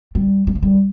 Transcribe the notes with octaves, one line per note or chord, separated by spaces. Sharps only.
G3
G3
F3
G3